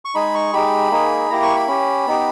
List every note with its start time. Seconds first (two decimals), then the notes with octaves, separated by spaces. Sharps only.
0.05 C#6
0.15 G#3 D#4 G#4 B5
0.35 C#6
0.53 G#3 D#4 G4 B5
0.91 A#3 D#4 G#4
1.30 A#3 E4 G4 A#5
1.43 C#6
1.56 B5
1.68 C#4 G4
2.06 B3 D#4 G4